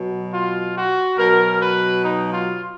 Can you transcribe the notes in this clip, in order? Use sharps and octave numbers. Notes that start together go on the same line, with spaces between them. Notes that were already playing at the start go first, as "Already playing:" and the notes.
Already playing: B2 F#3
F4
F#4
B2 F#3 A#4
B4
D#4
F4